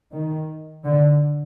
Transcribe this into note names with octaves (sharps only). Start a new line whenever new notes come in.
D#3
D3